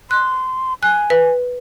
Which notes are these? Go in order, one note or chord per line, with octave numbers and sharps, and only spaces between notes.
C6 F#6
G#5 F#6
B4